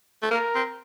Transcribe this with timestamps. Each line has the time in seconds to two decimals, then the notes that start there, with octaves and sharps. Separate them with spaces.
0.22 A3
0.31 A#3 A#4
0.55 C4